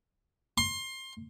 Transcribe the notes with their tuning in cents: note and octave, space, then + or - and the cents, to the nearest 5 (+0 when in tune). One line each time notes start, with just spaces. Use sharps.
C6 +20